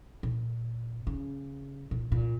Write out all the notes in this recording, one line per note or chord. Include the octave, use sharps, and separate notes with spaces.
A#2
C#3
A#2
A#2